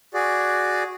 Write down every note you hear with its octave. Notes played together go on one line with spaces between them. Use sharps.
F#4 G#4 D5